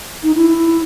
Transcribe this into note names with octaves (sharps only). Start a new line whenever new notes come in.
D#4
E4